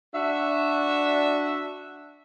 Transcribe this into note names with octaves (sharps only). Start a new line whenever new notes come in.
D4 F#4 E5